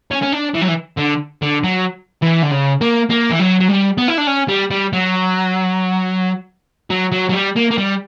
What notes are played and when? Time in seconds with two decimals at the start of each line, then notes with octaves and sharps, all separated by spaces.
0.11 C#4
0.23 C#4
0.32 D4
0.55 E3
0.62 F#3
0.68 E3
0.98 D3
1.42 D3
1.64 F#3
2.22 E3
2.43 D3
2.52 C#3
2.81 A#3
3.10 A#3
3.31 E3
3.39 F#3
3.60 F#3
3.68 G3
3.98 B3
4.08 E4
4.18 D4
4.27 C#4
4.49 G3
4.71 G3
4.93 F#3
6.90 F#3
7.12 F#3
7.30 F#3
7.34 G3
7.56 A#3
7.71 A#3
7.78 G3